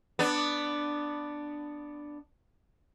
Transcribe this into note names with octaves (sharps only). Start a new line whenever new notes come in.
B3 D4